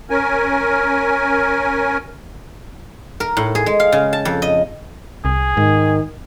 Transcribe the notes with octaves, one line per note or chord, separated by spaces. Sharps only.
C#4 A#4 G#5
A#4
A2
G#4
G#3
F5
C#3
A5
F2
D#5
C2 G#4
G#2 D#3